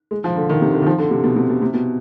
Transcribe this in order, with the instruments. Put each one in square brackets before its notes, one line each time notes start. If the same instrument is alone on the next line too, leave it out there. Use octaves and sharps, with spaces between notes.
[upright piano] G#3
F3
D3
D#3
C3
D3
D#3
F3
D3
C3
B2
C3
B2
C3
B2